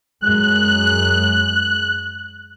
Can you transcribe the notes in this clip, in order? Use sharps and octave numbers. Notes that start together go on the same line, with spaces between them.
F#2 G#3 F#6